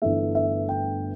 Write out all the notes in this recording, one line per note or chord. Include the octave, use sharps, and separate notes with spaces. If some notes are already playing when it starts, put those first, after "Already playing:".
G1 G2 E3 A3 E5
E5
G5